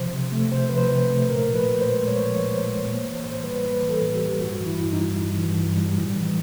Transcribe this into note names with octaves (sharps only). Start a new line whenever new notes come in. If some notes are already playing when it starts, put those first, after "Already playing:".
Already playing: C3 F3 C5
C3
A3
C3 C5
F3 B4
C5
C3
A3
A#2 A#4
F3
B4
A#2
C5
G#3
A#2 C#5
C5
F3 C#5
A#2 C5
G#3
A#3 C#5
E3 C5
A2 C5
G3 B4
A#3 B4
E3
A4
A2
G4
G3
G2 F#4
E3
E4
G2
D#4
G3
G2
E3
G2
G3
A2
E3